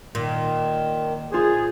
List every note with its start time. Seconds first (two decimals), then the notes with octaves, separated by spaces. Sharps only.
0.15 A#2 D#3
1.33 F4 G#4 C5